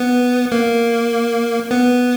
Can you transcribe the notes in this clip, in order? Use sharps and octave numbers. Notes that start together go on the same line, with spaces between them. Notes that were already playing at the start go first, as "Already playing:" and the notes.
Already playing: B3
A#3
B3